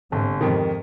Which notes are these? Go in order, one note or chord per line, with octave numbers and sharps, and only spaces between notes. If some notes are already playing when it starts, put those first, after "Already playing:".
G1 G#2 C3
F2 G#2 C3 D#3